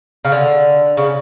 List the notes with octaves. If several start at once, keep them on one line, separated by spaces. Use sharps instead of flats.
C#3
D3
C#3